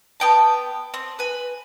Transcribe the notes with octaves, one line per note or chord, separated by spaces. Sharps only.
B3 G5 A5
C4
B4 G#5